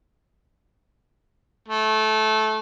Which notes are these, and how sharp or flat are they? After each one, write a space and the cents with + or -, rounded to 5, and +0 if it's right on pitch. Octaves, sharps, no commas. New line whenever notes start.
A3 -20